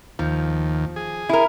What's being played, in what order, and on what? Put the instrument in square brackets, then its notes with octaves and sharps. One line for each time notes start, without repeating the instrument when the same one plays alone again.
[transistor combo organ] D#2 [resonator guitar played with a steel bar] F3
[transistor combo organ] G#4
[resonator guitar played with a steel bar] E4 A#4